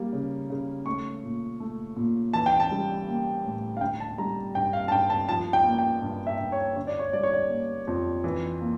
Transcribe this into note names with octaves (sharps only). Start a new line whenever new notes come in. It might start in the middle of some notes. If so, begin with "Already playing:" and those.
Already playing: G3 A#3
C#3
C#3
A3 C#6
A#2
A3
A#2
E3 A5
G5
A5
G3
A#3
A2
F5
D3 G5
A5
G3 A#5
G2 G5
F5
A5
G2 G5
A5
F3 A5
G5
A#3
G5
G2
E5
G2
C#5
D3 C#5
D5
C#5
G3 D5
C#5
D5
A#3
F2
E3
A#3